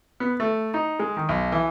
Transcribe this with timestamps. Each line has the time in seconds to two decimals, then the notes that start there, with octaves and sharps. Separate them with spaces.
0.20 B3
0.40 A3
0.74 D#4
0.99 G#3
1.17 D#3
1.29 B1
1.52 E3